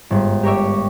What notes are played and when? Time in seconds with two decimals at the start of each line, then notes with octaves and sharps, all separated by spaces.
0.11 G1 G#2
0.43 G4 A#4 C#5 D5 E5